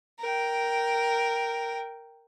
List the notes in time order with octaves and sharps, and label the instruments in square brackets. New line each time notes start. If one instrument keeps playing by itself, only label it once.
[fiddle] A#4 G5